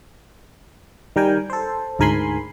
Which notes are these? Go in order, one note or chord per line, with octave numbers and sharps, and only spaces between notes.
D#3 G3 A#4 G5 G#5
A4 C5
D2 G#2 A#4 G#5 B5 C6